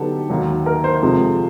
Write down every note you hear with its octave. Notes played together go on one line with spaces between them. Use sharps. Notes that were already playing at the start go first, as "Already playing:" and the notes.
Already playing: D3 F#3 B3 D#4 G4 A4
D#2 D#3 F#3
A#4
C5
F2 C3 F3 G#3